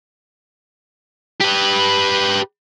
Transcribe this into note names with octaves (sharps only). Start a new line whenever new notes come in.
G4 B4